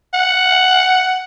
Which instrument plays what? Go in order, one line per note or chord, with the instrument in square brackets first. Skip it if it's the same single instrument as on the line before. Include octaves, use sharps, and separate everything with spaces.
[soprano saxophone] F#5